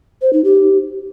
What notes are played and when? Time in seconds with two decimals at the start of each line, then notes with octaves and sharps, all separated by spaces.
0.22 C5
0.33 D#4
0.44 G4